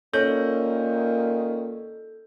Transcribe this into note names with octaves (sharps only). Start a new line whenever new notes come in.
A#2 D#3 C#4 A4 G6